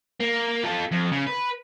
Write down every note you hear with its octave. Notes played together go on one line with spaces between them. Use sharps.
A#3
F4 A4
F2
C#3
B4